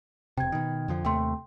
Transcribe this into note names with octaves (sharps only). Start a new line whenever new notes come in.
E1 C3 G5 G#6
B2 D#3
F2 D3 F3
D#2 C3 A3 G5 C6